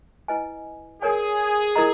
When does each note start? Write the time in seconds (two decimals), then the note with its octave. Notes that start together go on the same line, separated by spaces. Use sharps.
0.28 E4 B4 D#5 G#5
1.02 G#4 A#4 C#5 G#5
1.76 E4 A#4 D#5 A#5